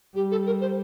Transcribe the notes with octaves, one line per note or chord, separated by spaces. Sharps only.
G3 G4
A4
A#4
C5